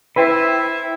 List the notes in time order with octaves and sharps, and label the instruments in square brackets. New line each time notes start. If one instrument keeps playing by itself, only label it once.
[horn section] E4 E5 [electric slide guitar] B4 C5 G5